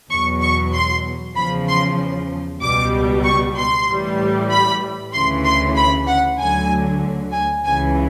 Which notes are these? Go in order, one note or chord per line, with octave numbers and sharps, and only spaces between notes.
E2 B2 F#3 C#6
C#6
C6
E2 C#3 F3 B5
C6
C#2 B2 G3 D6
C#6
C6
A2 E3 G3
B5
D2 C#3 E3 C6
C6
B5
F#5
D2 D3 F#3 G#5
G#5
C#2 C#3 E3 G#5